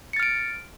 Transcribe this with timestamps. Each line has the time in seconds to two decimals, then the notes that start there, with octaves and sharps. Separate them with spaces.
0.13 C#7
0.16 A6
0.20 F6
0.23 D7